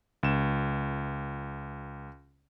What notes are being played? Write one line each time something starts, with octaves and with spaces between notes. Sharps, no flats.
C#2 E7